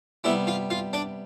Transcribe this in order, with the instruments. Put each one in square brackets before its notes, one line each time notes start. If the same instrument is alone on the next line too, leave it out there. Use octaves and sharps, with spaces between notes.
[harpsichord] C3 G3 B3 E4 E5
F4 F5
F4 F5
D4 D5